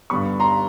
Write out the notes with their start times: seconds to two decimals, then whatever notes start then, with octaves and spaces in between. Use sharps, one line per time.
0.10 G2 D3 G3 B3 B5 C#6
0.40 A#5 C6